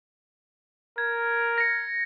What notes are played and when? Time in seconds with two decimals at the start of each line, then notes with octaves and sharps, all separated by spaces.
0.98 A#4 G#6
1.58 A#6 C#7